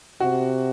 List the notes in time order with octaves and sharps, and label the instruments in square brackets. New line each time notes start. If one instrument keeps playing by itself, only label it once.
[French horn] C3 [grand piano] F#4